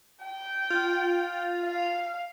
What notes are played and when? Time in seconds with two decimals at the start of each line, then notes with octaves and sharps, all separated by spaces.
0.24 G5
0.70 F4
1.64 F5